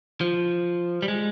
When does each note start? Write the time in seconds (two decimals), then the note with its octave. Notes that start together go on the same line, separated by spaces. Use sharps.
0.21 F3
1.02 G3
1.08 G#3